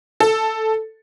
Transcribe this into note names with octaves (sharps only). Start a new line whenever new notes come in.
A4